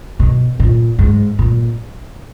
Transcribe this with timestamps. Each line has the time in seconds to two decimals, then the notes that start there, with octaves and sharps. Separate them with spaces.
0.19 B2
0.60 A#2
0.99 G#2
1.39 A#2